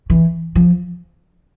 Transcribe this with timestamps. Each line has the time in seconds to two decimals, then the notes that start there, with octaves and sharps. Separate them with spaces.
0.10 E3
0.55 F3